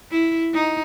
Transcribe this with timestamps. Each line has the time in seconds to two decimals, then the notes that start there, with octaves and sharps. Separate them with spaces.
0.11 E4
0.54 D#4